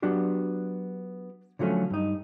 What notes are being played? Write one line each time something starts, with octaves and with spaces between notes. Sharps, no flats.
F#3 B3 D4 F#4 G4
D3 F3 F#3 A3 C#4
G2 D#4